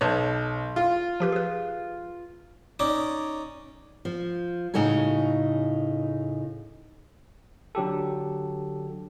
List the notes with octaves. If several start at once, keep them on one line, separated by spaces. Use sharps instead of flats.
B1 B4 C#5 A5
F4
F3 G4 B4
G#4 B4
C#4 D#4 D5
F3
A2 C#3 D#4 F#4 A4 G#5
D3 F#3 G4 A4